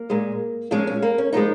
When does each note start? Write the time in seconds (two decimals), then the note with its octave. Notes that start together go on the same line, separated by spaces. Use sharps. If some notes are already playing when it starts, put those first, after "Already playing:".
Already playing: A#3
0.10 A#2 G#3
0.71 A#2 F3 G#3 C#4
0.87 C#4
1.02 A#3
1.18 C#4
1.33 A#2 F3 G#3 D#4